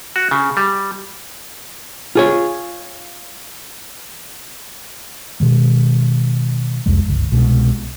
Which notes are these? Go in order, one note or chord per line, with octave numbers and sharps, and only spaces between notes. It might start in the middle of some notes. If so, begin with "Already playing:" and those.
F#4
C#3
G3
F4 G#4 C#5
B2 D#3 G#3
C2 F2 G#3
G1 C#2
C2 B2 G#3